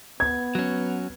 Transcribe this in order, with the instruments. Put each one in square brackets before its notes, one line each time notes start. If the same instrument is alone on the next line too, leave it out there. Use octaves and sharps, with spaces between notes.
[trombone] B3 [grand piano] G#6
[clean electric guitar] F#3 C#4